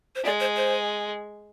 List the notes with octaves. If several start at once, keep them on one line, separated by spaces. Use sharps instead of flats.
C5
G#3 D5
C5
C5